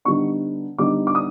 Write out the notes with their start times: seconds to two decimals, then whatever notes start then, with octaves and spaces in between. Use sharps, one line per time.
0.05 D3 G3 B3 D#4 C#6
0.78 D3 G3 B3 D#4 D6
1.07 D6
1.15 D#6